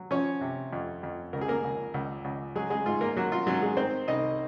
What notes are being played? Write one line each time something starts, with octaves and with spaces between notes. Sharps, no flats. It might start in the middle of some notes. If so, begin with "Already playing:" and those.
Already playing: F#3
F3 C#4 C#5
C3
F2
F2
C#2 A#4
G#4
A#3 A#4
C#2
C#2
C#2
F#3 G#3 G#4
G#3 G#4
G#2 F4
A#3 A#4
F#3 A#3 F#4
F4
G#2 F#3 F#4
G#3 G#4
D#3 C4 C5
C2 D#4 D#5